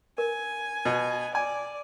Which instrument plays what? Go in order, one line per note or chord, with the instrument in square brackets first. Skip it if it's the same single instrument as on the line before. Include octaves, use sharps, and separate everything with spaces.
[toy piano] A#4 [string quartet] G#5
[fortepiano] B2
[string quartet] D5 [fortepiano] G#5